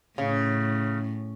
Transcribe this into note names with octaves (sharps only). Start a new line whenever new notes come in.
A2 C#3